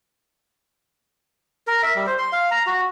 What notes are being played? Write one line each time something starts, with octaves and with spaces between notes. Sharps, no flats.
A#4
E5
G3
C5
C6
F5
A#5
F#4